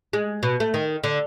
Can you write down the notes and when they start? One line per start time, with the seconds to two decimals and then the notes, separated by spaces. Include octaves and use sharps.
0.13 G#3
0.43 B2
0.60 A3
0.74 D#3
1.04 D3